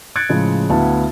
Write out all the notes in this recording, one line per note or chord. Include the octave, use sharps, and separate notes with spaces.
F#6 G#6 A6 C#7 D7
A2 C#3 F3 G#3
D2 B3 E4 F5 A5